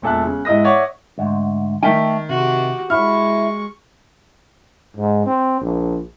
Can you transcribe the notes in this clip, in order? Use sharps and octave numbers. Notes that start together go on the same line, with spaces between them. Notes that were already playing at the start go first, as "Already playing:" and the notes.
E1 A#2 A4 E5 F#6
C#3
G#2 E4 D#5 D#6 A#6
C#5 D5 E5 F#5 C#6
D2 G#2
D#3 A3 E5 G5
C3 F#4 G4
G#3 E4 C#6 F6
G#2
C4
A#1